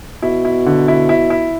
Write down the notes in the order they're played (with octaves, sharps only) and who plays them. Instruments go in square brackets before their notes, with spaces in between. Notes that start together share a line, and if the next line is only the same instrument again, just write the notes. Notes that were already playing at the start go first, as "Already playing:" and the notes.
[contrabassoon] B2 [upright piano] E4
[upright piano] E4
D3
E4
E4
E4